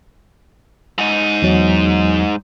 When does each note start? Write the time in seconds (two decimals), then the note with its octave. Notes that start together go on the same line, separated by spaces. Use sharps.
0.98 G#2 D#4
1.42 E2 F#3